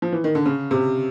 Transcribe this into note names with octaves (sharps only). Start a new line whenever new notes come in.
F3
E3
D#3
D3
C#3
C3